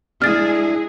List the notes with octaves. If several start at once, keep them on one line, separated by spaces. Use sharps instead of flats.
G#3 D4 E4 G#4 F6 A6